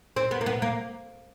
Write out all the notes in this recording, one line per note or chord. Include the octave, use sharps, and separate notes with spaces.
C4
B3
A#3
B3
A#3